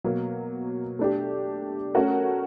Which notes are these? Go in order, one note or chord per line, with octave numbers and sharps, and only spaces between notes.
B2 F#3 A#3
A3 D4 G4
A3 C#4 F#4 A#4